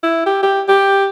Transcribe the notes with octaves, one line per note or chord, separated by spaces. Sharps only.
E4
G4
G4
G4